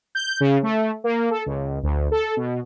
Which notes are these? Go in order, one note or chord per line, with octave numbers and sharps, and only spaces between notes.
G6
C#3
A3
A#3
A4
C#2
D2
A4
B2